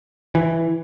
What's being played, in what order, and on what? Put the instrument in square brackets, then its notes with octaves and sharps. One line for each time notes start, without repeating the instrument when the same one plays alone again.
[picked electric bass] E3